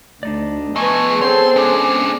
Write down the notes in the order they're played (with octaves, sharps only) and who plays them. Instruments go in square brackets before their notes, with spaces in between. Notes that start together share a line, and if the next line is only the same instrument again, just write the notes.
[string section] D2 [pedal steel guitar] D4 D#4 D5
[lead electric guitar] F3 A3 [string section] B3 G#4 [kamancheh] B4 G#5 [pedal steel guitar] D#5 C#6
[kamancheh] C4 A4 [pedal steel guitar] C#5 G6 [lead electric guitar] C6
[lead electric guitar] G#3 D4 [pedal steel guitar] C#4